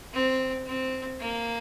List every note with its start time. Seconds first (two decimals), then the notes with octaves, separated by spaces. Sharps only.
0.13 C4
0.66 C4
1.20 A#3